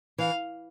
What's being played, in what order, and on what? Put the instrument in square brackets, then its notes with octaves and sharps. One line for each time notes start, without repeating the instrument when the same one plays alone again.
[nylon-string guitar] E3 [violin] F5